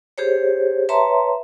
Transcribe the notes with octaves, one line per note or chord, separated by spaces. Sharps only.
G4 G#4 C5 C#5
B4 C#5 E5 A5 A#5 C6